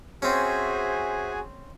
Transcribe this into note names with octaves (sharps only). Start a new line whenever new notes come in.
C4 C#4 F#4 G#4 C5 E5 G#5